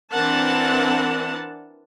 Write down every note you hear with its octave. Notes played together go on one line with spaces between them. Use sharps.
E3 C4 D4 A#4 F#5 A5